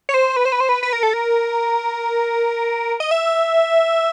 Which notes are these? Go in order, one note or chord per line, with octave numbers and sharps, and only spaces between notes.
C#5
C5
B4
C5
B4
C5
B4
B4
A#4
A4
A#4
D#5
E5